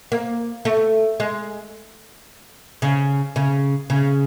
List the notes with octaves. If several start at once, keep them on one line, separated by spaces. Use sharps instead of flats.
A#3
A3
G#3
C#3
C#3
C#3